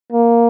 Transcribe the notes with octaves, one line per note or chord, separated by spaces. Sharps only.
A#3